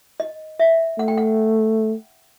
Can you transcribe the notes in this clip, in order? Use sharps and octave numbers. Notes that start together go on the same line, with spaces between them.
D#5
E5
A3 F#5
G5
F#5